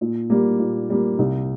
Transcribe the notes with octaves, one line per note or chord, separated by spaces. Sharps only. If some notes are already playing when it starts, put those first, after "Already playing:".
A#2
G3 A#3
A#2
G3 A#3
C2